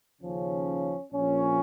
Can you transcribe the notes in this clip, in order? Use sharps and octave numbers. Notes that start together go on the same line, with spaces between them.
D#2 C#3 F3 C#4
A#1 A#2 F3 C#4